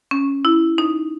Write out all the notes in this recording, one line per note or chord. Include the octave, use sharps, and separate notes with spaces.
C#4
E4
D#4